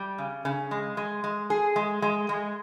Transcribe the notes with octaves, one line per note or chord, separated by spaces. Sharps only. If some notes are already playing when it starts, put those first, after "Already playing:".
Already playing: G3
C#3
C#3
G#3
G#3
G#3
G#4
G#3
G#3
G#3